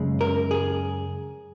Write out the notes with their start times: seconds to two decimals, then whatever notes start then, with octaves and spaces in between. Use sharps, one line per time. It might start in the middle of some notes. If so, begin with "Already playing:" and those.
Already playing: F#2 C#3 G#3
0.21 A#4
0.51 G#4